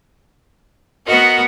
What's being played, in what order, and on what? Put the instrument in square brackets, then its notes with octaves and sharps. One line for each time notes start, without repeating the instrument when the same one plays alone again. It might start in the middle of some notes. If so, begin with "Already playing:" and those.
[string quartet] B3 F#4 A#4 [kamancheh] D#5 F#5